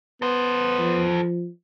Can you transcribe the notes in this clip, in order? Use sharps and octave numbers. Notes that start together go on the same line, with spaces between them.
B3 A4 C5
F3